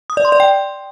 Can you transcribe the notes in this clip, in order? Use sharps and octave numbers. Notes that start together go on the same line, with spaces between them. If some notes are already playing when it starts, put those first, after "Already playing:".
D#6
D5
C6
D5
G5